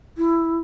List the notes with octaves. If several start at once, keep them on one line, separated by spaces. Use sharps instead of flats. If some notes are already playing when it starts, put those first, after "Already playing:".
E4